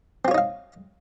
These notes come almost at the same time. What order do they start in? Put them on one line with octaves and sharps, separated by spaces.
C4 F4 C#5 D#4 F5